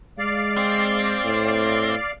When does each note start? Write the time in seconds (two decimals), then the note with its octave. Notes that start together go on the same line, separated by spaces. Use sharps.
0.18 G#3 D5 F5
0.57 C4
1.24 A2